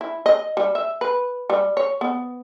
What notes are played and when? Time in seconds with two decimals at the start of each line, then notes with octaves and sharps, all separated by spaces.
0.01 E4
0.26 D#5
0.57 G3
0.75 E5
1.01 B4
1.50 G3
1.77 C#5
2.01 B3